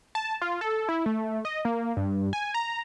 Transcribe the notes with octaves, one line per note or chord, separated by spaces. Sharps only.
A5
F4
A4
E4
A3
D#5
A#3
G2
G#5
A#5